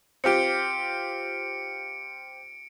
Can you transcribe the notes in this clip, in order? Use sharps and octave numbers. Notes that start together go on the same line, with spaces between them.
C4 F4 G4 C#7 D7